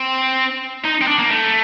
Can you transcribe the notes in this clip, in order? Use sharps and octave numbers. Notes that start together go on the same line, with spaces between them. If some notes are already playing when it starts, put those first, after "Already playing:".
Already playing: C4
D#4
C4
D4
A#3
A3